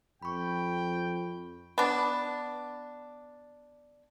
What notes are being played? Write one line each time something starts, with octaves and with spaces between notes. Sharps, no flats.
F2 G5 B5 C#6
B3 D4